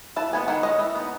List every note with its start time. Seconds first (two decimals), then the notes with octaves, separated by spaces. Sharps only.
0.16 E3 A5
0.33 G#3 B3 G#5
0.48 D#3 F#5
0.63 G#3 C#4 D#5
0.79 E3
0.95 B3 D#4